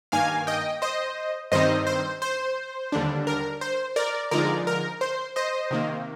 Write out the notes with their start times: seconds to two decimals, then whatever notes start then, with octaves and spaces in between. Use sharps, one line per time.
0.12 G2 D#3 A#3 F5 G#5
0.47 D#5 G5
0.82 C5 D#5
1.52 G2 D#3 G3 C4 D#4 C5 D#5
1.87 C5
2.22 C5
2.92 D#2 D3 G3 D4
3.27 A#4
3.61 C5
3.96 A#4 D5
4.31 D3 F3 G#3 D#4 A#4 D5
4.67 A#4
5.01 C5
5.36 C5 D#5
5.71 C3 D#3 A#3